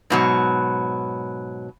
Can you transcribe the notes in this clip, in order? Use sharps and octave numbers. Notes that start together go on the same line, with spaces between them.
G#2 B2 F#3